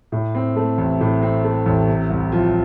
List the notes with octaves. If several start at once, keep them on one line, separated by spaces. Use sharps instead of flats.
A2
C4
A3
A1
A2
C4
A3
A1
C3
C2
F3